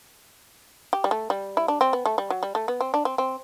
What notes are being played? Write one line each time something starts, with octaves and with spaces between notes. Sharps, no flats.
G4
G3
A3
G3
E4
D4
C4
B3
A3
G3
F#3
G3
A3
B3
C4
D4
C4
C4